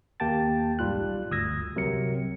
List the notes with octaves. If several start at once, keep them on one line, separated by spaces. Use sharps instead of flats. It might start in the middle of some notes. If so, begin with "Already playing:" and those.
D#2 A#3 G4 G5 A5 A6
B1 G#2 G3 F4 F#6
G1 D2 D#6 E6 G#6 A#6
C2 C3 F#3 A#4 C#7